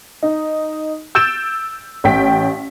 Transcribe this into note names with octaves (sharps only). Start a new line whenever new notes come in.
D#4
E6 G6 A6 D7 E7
A1 C#4 G5 B6